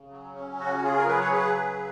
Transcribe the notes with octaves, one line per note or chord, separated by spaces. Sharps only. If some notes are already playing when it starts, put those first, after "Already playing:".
Already playing: C#3
F#3
C#4
C#3 F#4
F#4
C#3 F4 G#4
A#4
F#3 G#4 B4
C#5
C#3 G#4 B4
F#3